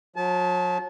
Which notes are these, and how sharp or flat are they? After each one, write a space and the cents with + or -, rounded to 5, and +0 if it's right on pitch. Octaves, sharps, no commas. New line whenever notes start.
F#3 -40 A5 -30